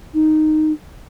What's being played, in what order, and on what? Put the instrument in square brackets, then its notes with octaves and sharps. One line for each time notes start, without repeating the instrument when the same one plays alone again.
[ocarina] D#4